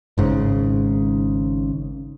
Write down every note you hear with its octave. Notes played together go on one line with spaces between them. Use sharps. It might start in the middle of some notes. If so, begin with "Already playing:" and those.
G#1 G#2 C#3